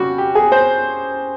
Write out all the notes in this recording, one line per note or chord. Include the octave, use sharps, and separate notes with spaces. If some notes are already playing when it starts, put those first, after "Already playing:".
Already playing: C#3 G3 F#4
G4
G#4
C5